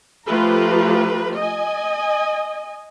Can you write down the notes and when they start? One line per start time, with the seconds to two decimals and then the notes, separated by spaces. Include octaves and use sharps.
0.27 F3 A3 F4 G4 B4 A#5
1.36 D#5 G#5